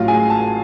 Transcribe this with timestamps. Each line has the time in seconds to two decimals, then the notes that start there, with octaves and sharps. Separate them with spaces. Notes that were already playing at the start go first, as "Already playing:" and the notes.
Already playing: A1 A2 F#3 F4 F5
0.08 G#4 G#5
0.30 A5